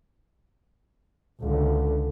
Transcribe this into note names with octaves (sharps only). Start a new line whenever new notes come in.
C#2 D3